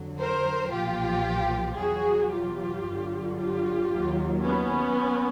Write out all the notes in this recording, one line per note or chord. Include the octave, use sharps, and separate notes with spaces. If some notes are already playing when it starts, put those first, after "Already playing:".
Already playing: F2 D3 F#3
A#4 C5
B1 A#2 F3 F4 G4
E2 B2 F#3 F#4 G#4
F4 G4
G1 G2 D3 F#3
F4 G4
D#2 D#3 F#3
B3 C#4